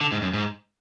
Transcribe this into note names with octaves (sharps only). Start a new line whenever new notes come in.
D3
G#2
F#2
G#2